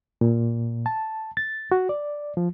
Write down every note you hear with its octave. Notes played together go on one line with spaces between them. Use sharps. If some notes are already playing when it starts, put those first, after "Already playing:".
A#2
A5
A6
F#4
D5
F3